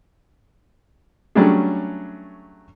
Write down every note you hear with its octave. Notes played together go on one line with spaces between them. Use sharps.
F#3 G3 A3 C#4 D4 G#4